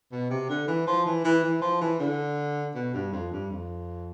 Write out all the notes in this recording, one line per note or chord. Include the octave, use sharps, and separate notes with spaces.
B2
C3
D3
E3
F3
E3
E3
E3
F3
E3
D3
B2
G2
F2
G2
F2